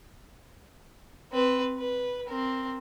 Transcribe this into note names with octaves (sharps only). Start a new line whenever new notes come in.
C4 B4
B4
C4 A#4